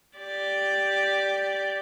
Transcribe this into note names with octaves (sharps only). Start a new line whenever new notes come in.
G4 D5